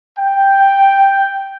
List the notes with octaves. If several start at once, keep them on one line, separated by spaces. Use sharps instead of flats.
G5